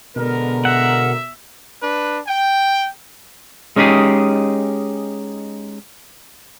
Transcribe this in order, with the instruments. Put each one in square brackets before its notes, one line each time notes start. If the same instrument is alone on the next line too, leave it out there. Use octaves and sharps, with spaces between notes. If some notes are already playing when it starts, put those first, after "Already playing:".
[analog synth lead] B2 [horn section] D3 G#3 A#4 [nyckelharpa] B3
[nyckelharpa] E5 [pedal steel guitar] F#5
[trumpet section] D4 B4
G5
[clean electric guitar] G#3 C#4 D#4 G4 G#4